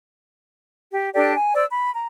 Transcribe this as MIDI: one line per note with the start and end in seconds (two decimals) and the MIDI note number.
0.93 1.10 67
1.14 1.32 62
1.14 1.32 67
1.14 1.32 69
1.14 1.32 74
1.34 1.53 80
1.55 1.65 72
1.55 1.65 74
1.55 1.65 88
1.71 1.92 83
1.94 2.06 82